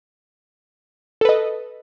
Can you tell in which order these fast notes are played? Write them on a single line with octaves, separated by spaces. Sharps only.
A4 B4 D#5